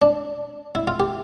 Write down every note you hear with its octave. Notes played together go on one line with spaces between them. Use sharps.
D4
E4
F4
G4